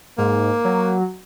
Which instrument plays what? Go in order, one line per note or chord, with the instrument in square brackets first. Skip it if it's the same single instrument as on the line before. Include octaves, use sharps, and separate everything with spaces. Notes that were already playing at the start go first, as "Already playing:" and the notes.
[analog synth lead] G#2 [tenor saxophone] A#3
[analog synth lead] F#3